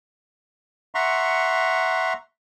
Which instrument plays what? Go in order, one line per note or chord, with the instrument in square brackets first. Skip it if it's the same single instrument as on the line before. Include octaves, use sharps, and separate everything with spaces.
[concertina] E5 F#5 A#5 C6 C#6